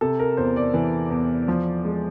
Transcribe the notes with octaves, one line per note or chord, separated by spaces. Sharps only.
C3 A4
A#4
E2 C5
D5
E3
E2
F3
G#3